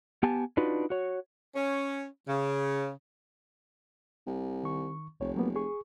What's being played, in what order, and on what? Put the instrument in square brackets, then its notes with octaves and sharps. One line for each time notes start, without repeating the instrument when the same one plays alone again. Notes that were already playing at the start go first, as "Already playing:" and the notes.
[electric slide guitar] B3 G4 G#5 A5
D4 D#4 F4 F#4 B4
F#4 C#5
[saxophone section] C#4
C#3
[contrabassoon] C2
[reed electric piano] D#3 C#6
[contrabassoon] F1 [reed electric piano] C2 C#5
[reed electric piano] F#3 A#3 B3
G#4 C#6